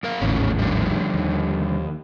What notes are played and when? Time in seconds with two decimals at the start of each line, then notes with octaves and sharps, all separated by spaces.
0.03 F#2 A#4 F5
0.21 G#1 D#2 A2 C#3 E3 C#4
0.59 D3 F3 G3
1.14 D#2